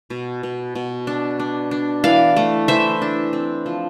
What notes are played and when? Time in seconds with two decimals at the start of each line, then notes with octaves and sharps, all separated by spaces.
0.10 B2
0.43 B2
0.75 B2
1.07 D4
1.40 D4
1.71 D4
2.04 E3 D5 F5
2.36 A3
2.68 E3 C5 E5
3.02 D4
3.33 C4
3.66 F3